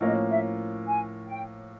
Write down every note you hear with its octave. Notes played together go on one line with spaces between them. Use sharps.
A2 F3 A#3 C#4 D#5
E5
G#5
G5